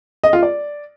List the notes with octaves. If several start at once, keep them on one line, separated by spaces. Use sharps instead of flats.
D#5
F4
D5